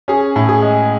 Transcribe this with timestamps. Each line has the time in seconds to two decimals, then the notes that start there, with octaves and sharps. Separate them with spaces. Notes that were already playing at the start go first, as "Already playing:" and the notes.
0.08 C#4 G#4
0.36 A2
0.49 G#4
0.62 G#3